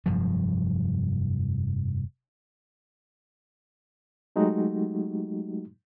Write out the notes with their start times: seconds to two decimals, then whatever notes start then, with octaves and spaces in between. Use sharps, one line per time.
0.06 F1 G2 F3 F#3
4.36 F#3 G#3 A3 D#4 F#4 G4